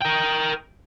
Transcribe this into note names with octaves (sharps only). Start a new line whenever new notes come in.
A#4 G5